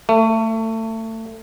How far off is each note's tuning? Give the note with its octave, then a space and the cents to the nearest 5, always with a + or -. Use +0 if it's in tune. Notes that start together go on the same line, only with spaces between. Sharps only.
A3 +25